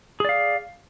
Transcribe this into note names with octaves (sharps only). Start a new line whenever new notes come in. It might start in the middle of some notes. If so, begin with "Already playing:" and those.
G#4 D5 F5